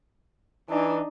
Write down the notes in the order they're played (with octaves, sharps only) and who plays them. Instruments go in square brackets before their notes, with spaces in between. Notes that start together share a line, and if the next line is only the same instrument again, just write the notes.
[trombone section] E3 [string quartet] D4 D#4